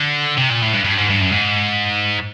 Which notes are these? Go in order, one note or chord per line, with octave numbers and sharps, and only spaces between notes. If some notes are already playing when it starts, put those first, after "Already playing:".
Already playing: D3
C3
A#2
A2
G2
G2
G#2
G2
F#2
G#2